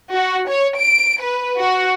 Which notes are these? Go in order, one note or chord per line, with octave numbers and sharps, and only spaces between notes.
F#4
C#5
D7
B4
F#4